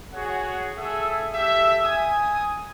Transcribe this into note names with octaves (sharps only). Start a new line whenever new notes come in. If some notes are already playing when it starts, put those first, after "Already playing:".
F#4 G#4 C#5 F#5
G#4 A4 E5
G4 A4 E5
G#5 D#6